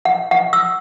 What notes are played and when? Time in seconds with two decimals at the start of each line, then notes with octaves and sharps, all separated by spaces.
0.05 F#5
0.31 F#5
0.53 E6